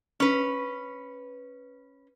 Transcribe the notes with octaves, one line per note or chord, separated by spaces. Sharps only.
C#4 B4